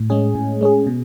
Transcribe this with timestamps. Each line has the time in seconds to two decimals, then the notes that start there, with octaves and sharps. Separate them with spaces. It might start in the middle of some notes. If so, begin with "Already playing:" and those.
Already playing: A2
0.10 G#3 C#4 G#4
0.35 A2
0.61 G#3 C#4 G#4
0.87 B2